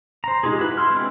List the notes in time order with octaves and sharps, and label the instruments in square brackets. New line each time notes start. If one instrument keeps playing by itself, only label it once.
[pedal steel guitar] C5 A#5
G#3 D#4 F4 G4 G#4
E4 F#4 B4
E4 C6 F6
G#3 B3 C4 D4